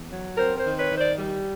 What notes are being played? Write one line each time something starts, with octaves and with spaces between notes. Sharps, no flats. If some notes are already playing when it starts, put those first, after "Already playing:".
Already playing: E2
F#3
C4 A#4 C5
A#4 C5
D#3
B4 C#5
D#3
C5 D5
G3